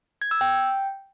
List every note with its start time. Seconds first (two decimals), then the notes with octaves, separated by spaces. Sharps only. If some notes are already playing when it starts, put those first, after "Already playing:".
0.21 G#6
0.31 E6
0.41 G5